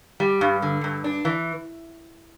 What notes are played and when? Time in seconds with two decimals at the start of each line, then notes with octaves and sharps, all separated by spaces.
0.20 G3
0.41 G2
0.62 D3
0.84 G2
1.04 D4
1.25 E3